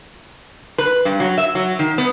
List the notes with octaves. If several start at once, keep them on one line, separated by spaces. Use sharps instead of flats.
B4
G2
F#3
E5
F#3
D#3
B3